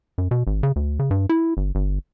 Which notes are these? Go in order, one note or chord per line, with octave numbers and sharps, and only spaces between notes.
F#2
B2
G#1
C#3
D2
C#3
G2
E4
G1
G1